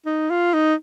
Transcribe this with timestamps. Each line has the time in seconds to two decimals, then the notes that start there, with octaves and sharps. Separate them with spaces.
0.06 D#4
0.30 F4
0.53 D#4